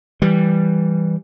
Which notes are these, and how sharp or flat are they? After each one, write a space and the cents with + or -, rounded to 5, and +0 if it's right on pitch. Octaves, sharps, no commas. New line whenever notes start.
E3 +0 G3 +0